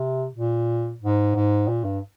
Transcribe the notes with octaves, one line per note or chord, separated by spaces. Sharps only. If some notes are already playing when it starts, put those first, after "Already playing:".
Already playing: C3
A#2
G#2
G#2
A#2
G2